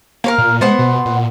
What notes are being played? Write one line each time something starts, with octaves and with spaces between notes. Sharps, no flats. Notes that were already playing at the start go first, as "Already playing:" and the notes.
A#3 A#4 C#5 F5
A#2
G#3 B3 C5 F#5
B2
A#2